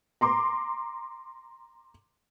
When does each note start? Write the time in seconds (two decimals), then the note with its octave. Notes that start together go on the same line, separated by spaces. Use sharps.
0.21 A#5 C6 D6